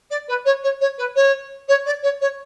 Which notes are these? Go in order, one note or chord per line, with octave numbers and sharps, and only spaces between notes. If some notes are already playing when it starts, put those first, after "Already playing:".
D5
B4
C#5
C#5
C#5
B4
C#5
C#5
D5
C#5
C#5